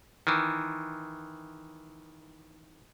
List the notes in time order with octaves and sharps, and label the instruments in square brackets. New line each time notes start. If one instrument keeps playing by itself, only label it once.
[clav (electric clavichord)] D#3 E3